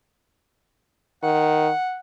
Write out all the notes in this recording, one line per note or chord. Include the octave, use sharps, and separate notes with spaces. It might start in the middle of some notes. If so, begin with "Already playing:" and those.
D#3 F#5